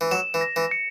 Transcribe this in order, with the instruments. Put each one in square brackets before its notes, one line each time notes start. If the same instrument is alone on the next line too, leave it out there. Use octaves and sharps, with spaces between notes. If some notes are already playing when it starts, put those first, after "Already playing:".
[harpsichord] E3
[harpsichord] F#3 [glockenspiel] E7
[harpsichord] E3
[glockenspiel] A#6
[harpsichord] E3
[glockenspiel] C#7